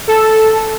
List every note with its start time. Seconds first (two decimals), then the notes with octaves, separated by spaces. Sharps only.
0.07 A4